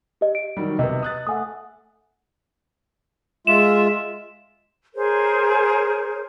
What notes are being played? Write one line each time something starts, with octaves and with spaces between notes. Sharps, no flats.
G4 D#5
D7
D#3 F#3 G3
C3 B3 D#5
D#6 F#6 A6
A3 F#5 G#5 D#6
G#3 F4 E5 E7
G#4 A#4 C5 C#5